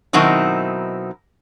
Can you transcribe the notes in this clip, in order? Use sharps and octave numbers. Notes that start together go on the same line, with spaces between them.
B2 D#3 F#3 C4 D#4 E4